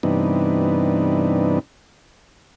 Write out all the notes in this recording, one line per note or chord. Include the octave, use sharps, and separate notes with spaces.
G2 C3 E3 B3 D4 D#4